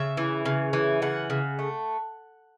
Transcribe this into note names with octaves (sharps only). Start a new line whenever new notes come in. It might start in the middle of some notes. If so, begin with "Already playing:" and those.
Already playing: C#3 E5
E3
C#3
E3
C#3 F#5
C#3
A3